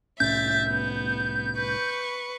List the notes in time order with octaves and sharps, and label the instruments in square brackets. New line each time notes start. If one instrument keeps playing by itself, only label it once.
[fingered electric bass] C2 A2 C#4 [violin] E5 A6 [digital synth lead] G6
[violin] B3
B4 C#6